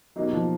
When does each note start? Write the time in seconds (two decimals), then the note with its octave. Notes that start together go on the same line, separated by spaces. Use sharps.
0.16 B2 F#3 G3 A#3 D#4
0.33 F3